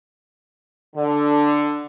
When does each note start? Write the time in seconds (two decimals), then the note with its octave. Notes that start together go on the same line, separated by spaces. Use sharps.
0.96 D3